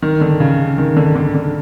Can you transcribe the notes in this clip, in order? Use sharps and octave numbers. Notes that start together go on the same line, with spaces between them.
D#3
D3
C#3
D#3
D3
D3
D3